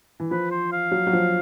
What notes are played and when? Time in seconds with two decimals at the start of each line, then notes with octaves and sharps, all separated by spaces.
0.20 E3
0.31 F3 B4
0.51 C5
0.72 F5
0.92 F#3
1.07 F#3
1.13 F3